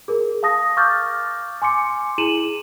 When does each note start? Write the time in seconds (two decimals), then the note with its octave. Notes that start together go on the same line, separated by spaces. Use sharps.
0.08 G#4 A#4
0.43 F5 A5 D#6 A#6
0.77 F5 C#6 D6 F6 G6 A6
1.62 G#5 C6 D6 C#7
2.18 E4 G#4 D#7 E7 F#7